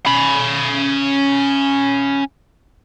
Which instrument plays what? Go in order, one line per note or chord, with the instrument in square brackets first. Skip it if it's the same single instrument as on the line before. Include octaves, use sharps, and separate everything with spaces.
[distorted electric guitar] C#4 B5